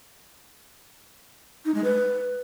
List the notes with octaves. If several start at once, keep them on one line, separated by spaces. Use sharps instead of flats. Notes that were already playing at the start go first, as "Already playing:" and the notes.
D#4
G#3
B4